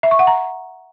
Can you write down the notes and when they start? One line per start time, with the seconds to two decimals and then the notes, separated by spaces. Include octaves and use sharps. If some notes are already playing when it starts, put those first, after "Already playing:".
0.03 E5
0.11 C#6
0.19 F#5
0.27 A#5